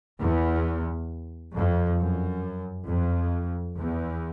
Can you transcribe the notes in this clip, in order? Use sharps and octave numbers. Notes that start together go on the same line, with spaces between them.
E2
F2
F#2
F2
E2